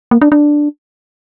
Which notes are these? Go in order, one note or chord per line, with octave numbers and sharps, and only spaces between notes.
A#3
D4
D4